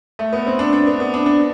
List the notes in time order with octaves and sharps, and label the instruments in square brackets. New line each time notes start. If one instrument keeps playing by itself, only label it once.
[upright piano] A3
B3
C4
D4
D4
B3
B3
D4
D4